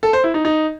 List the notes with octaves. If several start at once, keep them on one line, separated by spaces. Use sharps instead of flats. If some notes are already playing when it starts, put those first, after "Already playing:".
A4
C5
E4
D#4
D#4